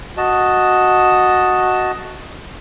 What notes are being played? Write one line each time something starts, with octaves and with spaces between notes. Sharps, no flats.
F#4 D#5 A5